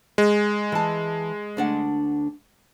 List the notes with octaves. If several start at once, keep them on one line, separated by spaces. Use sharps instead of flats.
G#3
E3 A5
D2 D4 F#5